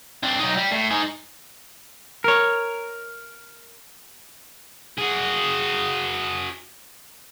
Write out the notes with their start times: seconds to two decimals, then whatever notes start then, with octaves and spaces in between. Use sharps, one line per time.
0.23 C4 D4
0.39 F#3 D#4
0.57 G3
0.72 A2
0.91 D#4 G#5
2.24 A#4 C#5
4.98 F#4 G#4